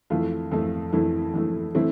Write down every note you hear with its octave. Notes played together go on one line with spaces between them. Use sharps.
F2 E3 A3 F4
F2 E3 A3
F2 E3 A3 E4
F2 E3 A3
E3 A3 C4 E4